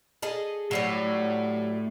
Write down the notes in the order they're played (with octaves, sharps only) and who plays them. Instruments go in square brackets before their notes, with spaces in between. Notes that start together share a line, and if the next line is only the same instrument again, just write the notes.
[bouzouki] G#4 A4 D#5
[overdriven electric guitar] A2 [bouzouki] F#3 G3 C#5